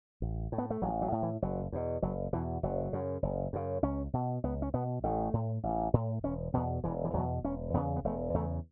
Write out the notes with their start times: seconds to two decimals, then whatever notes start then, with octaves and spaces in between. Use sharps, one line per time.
0.22 A1
0.52 A2
0.58 B3
0.70 A3
0.82 A1 F#3
1.02 F#3
1.12 A2
1.23 E3
1.42 F#1 F#3
1.72 E2 B2
2.02 F#1 F#3
2.33 E2 B2 E3
2.63 F#1 F#3
2.93 F#2 C#3
3.23 F#1
3.53 F#2 C#3
3.82 C#2 C#4
4.13 B2
4.44 C#2 B3
4.62 C#4
4.74 B2 B3
5.04 A1 A3
5.33 A2
5.63 A1
5.94 A2
6.23 E1 C#4
6.54 E2 B2 B3
6.84 E1 E3
7.05 E3
7.14 E2 B2 F#3
7.44 E1 C#4
7.74 E2 C#3 B3
7.96 B3
8.04 E1 A3
8.34 E2 C#3 A3